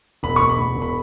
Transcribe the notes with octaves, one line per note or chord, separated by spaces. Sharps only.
E1 B5
E1 C#6
B5
E1
E1
B5